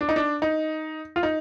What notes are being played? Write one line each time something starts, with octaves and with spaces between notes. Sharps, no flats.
D4
D#4
D4
D#4
F4
D#4